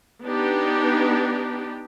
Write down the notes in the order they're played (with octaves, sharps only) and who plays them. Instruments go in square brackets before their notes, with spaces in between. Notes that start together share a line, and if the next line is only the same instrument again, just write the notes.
[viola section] B3 D4 D#4 G4